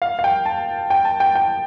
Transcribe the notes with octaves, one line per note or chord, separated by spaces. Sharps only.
F5
F5
G5
A5
G5
A5
G5
G5